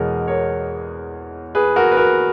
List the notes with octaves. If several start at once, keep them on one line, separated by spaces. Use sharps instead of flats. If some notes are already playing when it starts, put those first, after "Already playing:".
Already playing: E2 B2 G#3 A#4 C#5
A#4 C#5
G#4 B4
F#4 A#4
B4
F#4 A#4